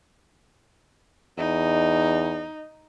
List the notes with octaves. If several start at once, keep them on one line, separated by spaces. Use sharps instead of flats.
E2 D#4